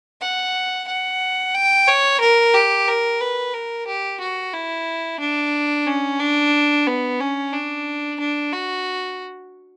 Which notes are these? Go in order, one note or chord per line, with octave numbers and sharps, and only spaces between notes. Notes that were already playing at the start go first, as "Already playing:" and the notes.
F#5
F#5
G5
C#5
A#4
G4
A#4
B4
A#4
G4
F#4
E4
D4
C#4
D4
B3
C#4
D4
D4
F#4